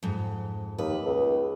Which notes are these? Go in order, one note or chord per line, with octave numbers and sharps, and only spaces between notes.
F2 G#2
D#2 B4
C#2